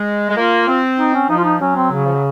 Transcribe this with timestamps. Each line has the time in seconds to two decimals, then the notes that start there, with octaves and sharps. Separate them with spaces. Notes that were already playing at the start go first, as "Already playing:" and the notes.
Already playing: G#3
0.29 G#3
0.36 A#3 F4
0.68 C4
0.99 D#4
1.14 C#4
1.29 F3 D#4
1.38 F4
1.44 D#4
1.60 F#3 C#4
1.76 C4
1.91 C#3
2.05 F3
2.14 F#3